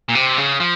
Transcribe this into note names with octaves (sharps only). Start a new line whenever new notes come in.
A#2
C3
C#3
F3